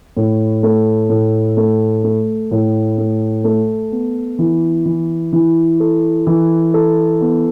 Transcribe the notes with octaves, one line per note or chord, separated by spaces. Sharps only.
A2
A3
A2
A3
A3
A2
A3
A3
B3
E3
E3
E3
A4
E3
A4
B3